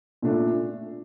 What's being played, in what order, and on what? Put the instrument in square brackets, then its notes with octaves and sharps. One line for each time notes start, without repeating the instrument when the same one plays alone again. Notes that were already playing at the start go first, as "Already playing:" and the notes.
[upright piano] A#2 A3 D4